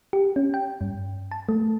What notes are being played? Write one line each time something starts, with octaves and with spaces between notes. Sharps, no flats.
G4
C#4
G5
G2
A5
A3